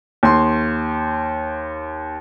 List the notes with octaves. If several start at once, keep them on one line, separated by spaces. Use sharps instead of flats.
D#2 C6